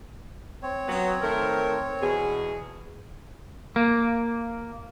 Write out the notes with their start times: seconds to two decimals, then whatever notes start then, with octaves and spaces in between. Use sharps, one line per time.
0.63 C4 C#5
0.88 F#3 B3
1.22 D#3 A3 A#4
2.01 E2 B2 G#4
3.76 A#3